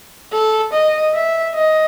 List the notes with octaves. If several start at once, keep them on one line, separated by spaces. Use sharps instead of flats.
A4
D#5
E5
D#5